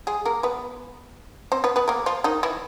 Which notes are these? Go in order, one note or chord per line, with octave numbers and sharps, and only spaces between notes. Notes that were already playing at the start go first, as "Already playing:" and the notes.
G#3 G#4
A#3 A#4
B3 B4
C4 C5
B3 B4
B3 B4
A#3 A#4
F3 F4
D#3 D#4
E3 E4